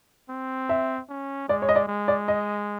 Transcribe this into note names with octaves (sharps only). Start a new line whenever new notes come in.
C4
E5
C#4
G#3 D5
C#5
D#5
D5
G#3
D5
D#5